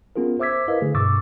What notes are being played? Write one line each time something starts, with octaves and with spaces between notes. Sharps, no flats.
B3 C#4 F4 G#4 A#4
C5 E5 D6 E6 G#6 B6
E4 A#4 B4 D#5 F5
D3 A3 G#4
G2 B2 C#6 D6 E6 A6